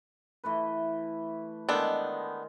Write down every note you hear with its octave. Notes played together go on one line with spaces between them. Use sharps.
E3 A3 B4
D#3 G#3 B3 D4 A4